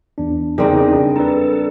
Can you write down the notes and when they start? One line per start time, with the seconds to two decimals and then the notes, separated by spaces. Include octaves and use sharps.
0.18 E2 D4
0.58 E2 C#3 G3 C4 D4 D#4 G#4 A#4
1.16 A4 B4 A#5